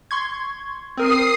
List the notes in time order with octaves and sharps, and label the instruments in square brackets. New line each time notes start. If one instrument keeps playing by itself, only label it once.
[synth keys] C6 C#6 G#6
[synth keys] C4 A#4 [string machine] D#6 C7